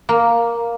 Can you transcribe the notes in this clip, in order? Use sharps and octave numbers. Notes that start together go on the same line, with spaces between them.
A#3